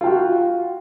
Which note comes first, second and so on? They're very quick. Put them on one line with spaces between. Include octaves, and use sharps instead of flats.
F4 G5 F#4